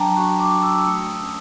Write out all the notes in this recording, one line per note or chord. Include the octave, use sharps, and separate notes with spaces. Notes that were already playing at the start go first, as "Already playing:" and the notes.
Already playing: F#3 D4 G5 A5 A#5
F#4 C#6
D6
F#4
E6
E6
A3 D#6
C#4